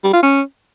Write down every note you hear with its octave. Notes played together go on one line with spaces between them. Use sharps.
G3
F4
C#4